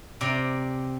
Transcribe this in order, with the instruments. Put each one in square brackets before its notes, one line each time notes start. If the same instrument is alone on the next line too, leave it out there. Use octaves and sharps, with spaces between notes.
[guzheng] C3 D5 A#5